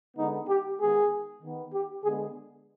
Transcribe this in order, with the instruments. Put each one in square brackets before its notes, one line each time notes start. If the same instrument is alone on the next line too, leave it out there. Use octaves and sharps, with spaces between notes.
[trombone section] D3 G#3 B3 D#4
G4
D#3 G#3 B3 G#4
D#3 B3
G4
D3 G#3 B3 G#4